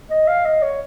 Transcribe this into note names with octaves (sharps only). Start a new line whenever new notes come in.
D#5
F5
D#5
C#5